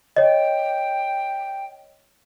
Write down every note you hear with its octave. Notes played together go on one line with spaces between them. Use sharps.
C#5 D#5 G5